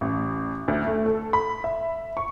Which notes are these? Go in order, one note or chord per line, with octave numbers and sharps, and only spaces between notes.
A1
D2
A3
A4
B5
E5
C#6